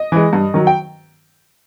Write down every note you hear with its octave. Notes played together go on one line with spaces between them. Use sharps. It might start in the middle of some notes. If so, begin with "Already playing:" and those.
Already playing: D#5
E3 G#3
G2
D#3 F#3
G5